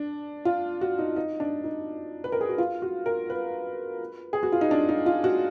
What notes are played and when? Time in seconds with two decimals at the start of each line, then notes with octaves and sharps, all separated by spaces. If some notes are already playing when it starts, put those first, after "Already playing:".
Already playing: D4
0.45 F4
0.81 F#4
0.98 D#4
1.16 D#4
1.40 D4
1.64 D#4
2.24 B4
2.32 A#4
2.41 G#4
2.49 F#4
2.58 F4
2.82 F#4
3.06 A#4
3.30 B4
4.33 G#4
4.43 F#4
4.52 F4
4.61 D#4
4.71 D4
4.89 D#4
5.06 F4
5.24 F#4